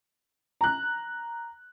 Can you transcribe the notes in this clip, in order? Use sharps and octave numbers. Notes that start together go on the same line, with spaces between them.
A#5 F#6